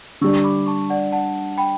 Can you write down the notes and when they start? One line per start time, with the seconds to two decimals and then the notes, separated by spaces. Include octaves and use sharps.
0.21 D3 G3 D4 C#6 E6
0.44 B5 D6
0.67 A5 C#6
0.90 D5 F#5
1.12 F#5 A5
1.58 G5 B5